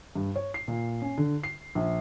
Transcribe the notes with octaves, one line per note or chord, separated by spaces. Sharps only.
G2
C#5
C7
A#2
C#4
D3
C7
A#1